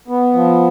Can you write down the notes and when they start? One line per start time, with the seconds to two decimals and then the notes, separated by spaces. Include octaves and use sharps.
0.08 B3
0.34 F3